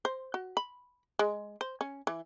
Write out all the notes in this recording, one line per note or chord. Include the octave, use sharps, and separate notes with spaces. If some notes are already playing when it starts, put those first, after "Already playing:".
C5
F#4
B5
G#3
C5
C#4
E3